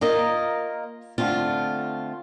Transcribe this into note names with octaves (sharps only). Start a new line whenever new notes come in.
A#3 F4 A#4 D#5
D3 A3 C4 F4